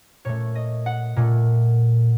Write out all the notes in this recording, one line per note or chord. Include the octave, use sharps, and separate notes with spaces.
A#2 A3 C#5
D#5
F#5
A#2 A3